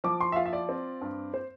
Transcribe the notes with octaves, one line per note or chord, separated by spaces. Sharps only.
F3 D6
C6
E5
F4 F5
E5
D5
C4
G2
C5